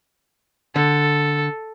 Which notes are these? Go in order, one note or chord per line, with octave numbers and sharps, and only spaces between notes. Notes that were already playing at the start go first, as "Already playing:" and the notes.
D3 A4